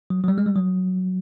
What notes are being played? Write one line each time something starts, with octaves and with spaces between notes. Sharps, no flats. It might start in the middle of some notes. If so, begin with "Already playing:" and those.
F#3
F#3
G3
G#3
G3
F#3